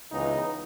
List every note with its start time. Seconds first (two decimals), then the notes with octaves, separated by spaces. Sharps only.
0.11 C#2 C#3 E3 B3 D#4